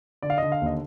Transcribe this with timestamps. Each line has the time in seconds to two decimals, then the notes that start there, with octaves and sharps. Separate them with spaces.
0.22 D3 D5
0.30 F5
0.38 D3 D#5
0.52 F5
0.61 D#2 D#5